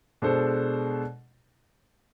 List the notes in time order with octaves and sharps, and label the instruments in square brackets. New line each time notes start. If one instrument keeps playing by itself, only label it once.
[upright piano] B2 G#3 D4 A4 C5